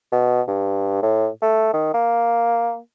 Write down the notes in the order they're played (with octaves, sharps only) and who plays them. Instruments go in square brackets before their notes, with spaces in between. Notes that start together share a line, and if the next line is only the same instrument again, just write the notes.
[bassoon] B2
G2
A2
A3
D#3
A#3